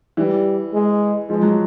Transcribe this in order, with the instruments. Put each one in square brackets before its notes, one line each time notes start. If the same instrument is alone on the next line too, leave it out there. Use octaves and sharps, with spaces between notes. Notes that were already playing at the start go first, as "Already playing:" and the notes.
[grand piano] E3 [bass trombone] G3
[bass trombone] G#3
[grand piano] F3 [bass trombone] G#3
[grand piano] F#3